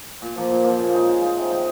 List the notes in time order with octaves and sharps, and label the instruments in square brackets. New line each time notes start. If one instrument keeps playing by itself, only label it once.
[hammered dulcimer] A#2
F3 A#3
A#2
F3 A#3
C#3
G#3 D#4
C#3
G#3 D#4
C3
D#3 G#3 D#4